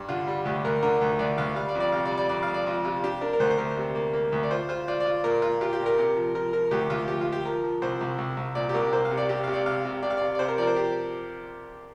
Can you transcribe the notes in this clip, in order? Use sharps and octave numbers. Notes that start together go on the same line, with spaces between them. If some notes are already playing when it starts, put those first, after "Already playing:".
Already playing: G2
D3 F4
G3
D2 G4
D2 A#4
D3 A#4
D2
D2 D5
D2 F5
G3 F5
D5
F2
D5
C3 F5
D5
G3
D5
F2 D5
F5
F2
D5
F2 F4
C3 F4
D4 G4
D4 A#4
A#4
D2 C5
C5
D2 A#4
C3
A#3
A#3
D2
D5
F4 C5
F4 C5
F4 D5
D5
F4
A#2 A#4
F4
F4 G4
G4
A#2
A#4
C3
F3
F3 A#4
F3 A#4
D2 G4
D2 F4
F3 G4
F4
F3
G4
F3 A#4
F3
C2 C5
C2
C2
C2
A#2 D5
G4
C2 A#4
A#3 C5
F5
C3
D5
C3 G4
C3 F5
D5
C3 F5
C3
C3 D5
F5
C3 D5
D5
C3 C5
A#4
F3 A#4 D5
C5
F3 G4